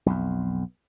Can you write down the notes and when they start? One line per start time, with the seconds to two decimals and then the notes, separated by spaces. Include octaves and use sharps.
0.06 B1 F2